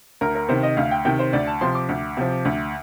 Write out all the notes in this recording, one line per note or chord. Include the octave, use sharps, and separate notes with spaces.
D2 A#4
A#4
C3 D#3 C5
D#5
D2 F5
G5
C3 D#3 G5
C5
D2 D5
A5
C3 F3 C6
D6
D2
C3 F3
D2